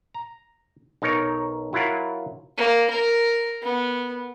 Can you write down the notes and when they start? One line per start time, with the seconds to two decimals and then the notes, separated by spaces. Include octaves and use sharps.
0.14 A#5
1.02 B1 D#4 A#4 C#5
1.73 F#3 E4 F4 A#4 F#5
2.57 A#3
2.90 A#4
3.62 B3